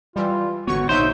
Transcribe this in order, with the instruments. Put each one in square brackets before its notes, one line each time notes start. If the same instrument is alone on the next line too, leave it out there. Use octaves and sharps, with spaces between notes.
[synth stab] E3 G3 [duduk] F4
[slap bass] G#1 D3 B3 [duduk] F#4 [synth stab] C#5 C#6
[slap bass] A#1 B2 [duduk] D#4 [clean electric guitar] C5 [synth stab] C#5 E5 G6